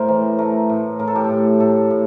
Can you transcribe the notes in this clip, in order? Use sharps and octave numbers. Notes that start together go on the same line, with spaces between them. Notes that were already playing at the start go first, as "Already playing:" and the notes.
Already playing: A2 A#4 C5
E3
A3 A#4
A2
A2 A#4
A4
G4
A4
A2
A2 A4
A2